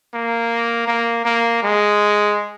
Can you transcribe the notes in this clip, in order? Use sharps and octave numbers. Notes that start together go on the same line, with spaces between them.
A#3
A#3
A#3
G#3